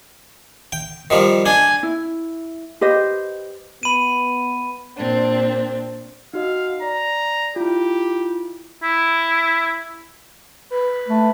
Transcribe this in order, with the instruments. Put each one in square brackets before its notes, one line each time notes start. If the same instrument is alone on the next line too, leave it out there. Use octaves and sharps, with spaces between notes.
[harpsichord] G5
D#3 F3 G3
[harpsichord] D4 [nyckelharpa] G#5
[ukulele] E4
G4 B4 C5 D#5
[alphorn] B3 [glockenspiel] B5 D#7
[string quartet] A#2 C4 D4
[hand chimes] D#4 F#4 D#5 [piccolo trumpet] F5
[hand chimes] D5 [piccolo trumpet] A#5
[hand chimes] E4 F4 [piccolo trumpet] G4
[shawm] E4
[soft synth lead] B4
[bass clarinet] A3